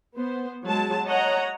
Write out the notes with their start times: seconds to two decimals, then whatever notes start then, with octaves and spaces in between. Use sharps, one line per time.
0.17 B3 C5
0.66 F#3 G#3 A5
1.07 C#5 D#5 F#5 A#5